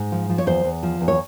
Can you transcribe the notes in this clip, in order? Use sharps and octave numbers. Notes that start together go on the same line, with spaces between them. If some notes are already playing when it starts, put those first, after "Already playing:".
Already playing: G#2
F3
F3
C#5
E2 C5
E2
F3
E2
C#5